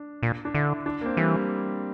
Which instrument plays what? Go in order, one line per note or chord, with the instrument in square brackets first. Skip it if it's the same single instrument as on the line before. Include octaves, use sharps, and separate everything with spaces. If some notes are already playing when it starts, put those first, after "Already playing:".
Already playing: [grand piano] D4
[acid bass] A#2
[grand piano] D4
[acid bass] D3 [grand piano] E4
[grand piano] D4
A#3
C4
[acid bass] E3 [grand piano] G3